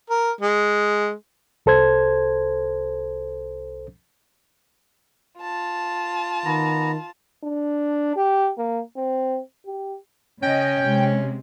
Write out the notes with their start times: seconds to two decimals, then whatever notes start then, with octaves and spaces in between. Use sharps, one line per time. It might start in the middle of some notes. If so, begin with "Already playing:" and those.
0.10 A#4
0.41 G#3
1.66 C2 A4 C5 G#6
5.40 F4 A5
6.45 D#3 B3 A#5
7.44 D4
8.16 G4
8.58 A#3
8.96 C4
9.66 G4
10.42 C#3 C#4 D#5 G5
10.84 C3 G#3